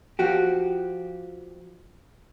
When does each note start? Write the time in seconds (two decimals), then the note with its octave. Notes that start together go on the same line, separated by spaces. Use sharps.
0.19 F3 F#4 G4